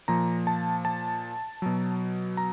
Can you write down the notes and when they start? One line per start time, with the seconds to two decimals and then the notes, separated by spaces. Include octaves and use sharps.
0.08 A#2 F3 A#5
0.47 A5
0.85 A5
1.62 B2 F#3
2.37 A#5